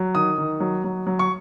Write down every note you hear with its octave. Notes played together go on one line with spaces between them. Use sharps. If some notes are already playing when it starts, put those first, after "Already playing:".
Already playing: F#3
D#3 D#6
D#3
F#3
F#3
F#3
C#6